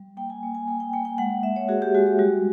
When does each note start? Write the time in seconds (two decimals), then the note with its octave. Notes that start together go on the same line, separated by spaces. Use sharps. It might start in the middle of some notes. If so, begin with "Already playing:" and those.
Already playing: G3
0.17 A#3 G5
0.30 G#5
0.43 A#3
0.55 G#5
0.67 A#3 G#5
0.80 G5
0.93 A#3 G5
1.05 G5
1.18 G#3 F#5
1.43 G#3 E5
1.56 C#5
1.68 F#4 G#4
1.82 G4
1.94 G#3 F#4
2.06 G4
2.19 G3 F#4